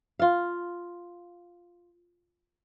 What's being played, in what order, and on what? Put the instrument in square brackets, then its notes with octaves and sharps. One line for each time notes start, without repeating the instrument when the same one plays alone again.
[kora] F4 F5